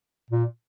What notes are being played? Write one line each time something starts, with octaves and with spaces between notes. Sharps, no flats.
A#2